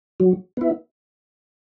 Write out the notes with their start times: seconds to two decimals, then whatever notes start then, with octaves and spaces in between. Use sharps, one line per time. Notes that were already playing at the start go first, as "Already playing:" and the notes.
0.20 F#3
0.57 B3 E4